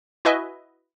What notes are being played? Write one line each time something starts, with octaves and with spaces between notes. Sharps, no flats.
E4 F#4 B4 D#5 E5 G#5